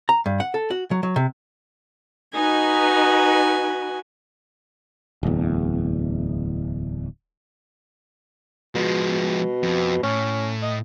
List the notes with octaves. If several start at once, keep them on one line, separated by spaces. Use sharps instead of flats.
A#5
G2
F#5
A4
F#4
F#3
F#3
C3
D#4 F#4 B4 G#5
D1 E2
B2 F3 G#3
F2
A2 C#4
D#5